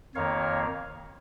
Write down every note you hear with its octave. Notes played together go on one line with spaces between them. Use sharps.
F2 D#3 A#3 C#5 F5